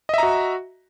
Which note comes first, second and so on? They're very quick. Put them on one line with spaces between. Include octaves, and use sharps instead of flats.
D#5 E5 A#5 F#4